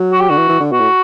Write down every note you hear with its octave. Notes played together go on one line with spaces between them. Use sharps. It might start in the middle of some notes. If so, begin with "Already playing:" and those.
Already playing: F#3
F#4
G4
D3 F#4
E3
E3
D3
B2 F#4
A2